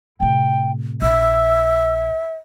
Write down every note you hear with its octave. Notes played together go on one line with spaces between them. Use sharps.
A2 C3 G5
A#1 E5 E6